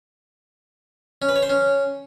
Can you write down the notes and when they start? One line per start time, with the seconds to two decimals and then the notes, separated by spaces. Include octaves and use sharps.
1.22 C#4
1.29 B4
1.36 C#5
1.43 C5
1.50 C#4